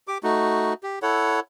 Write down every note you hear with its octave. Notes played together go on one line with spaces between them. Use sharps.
G4 D6
A3 D#4 F#4
G4
E4 A4 C#5 F#5